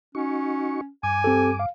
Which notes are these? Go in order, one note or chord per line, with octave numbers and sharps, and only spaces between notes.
C#4 D#4 F#4 C#6
G2 G#5 D6
C4 G4 A4
F5